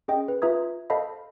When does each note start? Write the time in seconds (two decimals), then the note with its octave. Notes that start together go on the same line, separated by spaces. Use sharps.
0.08 C#4 G#4 D#5 G5
0.28 B4
0.42 F4 B4 E5 A#5 D#6 G#6
0.90 A4 C5 D#5 F5 A5 B5